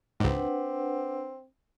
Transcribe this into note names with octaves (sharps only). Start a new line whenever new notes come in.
C#2 G#2 C4 D4 B4 F#5